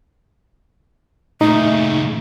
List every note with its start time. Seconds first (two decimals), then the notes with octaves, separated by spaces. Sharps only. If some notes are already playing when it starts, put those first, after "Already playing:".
1.41 A#2 C#3 A3 D#4